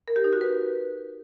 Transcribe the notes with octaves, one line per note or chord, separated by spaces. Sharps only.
A#4
G4
D#4
F#4
B4